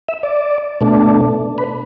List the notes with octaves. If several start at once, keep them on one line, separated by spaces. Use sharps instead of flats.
E5
D5
B2 A3 D4
B4